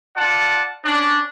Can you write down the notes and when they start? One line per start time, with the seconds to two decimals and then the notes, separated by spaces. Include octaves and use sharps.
0.16 F4 D5 F#5 A5
0.84 C#4 D4